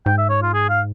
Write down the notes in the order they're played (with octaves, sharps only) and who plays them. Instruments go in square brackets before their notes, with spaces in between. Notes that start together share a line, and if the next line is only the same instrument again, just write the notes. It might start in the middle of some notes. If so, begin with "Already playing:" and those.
[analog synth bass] G#2 [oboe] G5
[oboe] E5
C#5
F4
G#4
F5